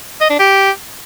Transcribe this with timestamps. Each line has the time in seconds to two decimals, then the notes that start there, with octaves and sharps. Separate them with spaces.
0.21 D#5
0.30 D4
0.39 G4